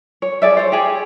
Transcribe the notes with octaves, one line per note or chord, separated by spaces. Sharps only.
C#5
G#4 D5 E5
C5 C#5
G4 G#4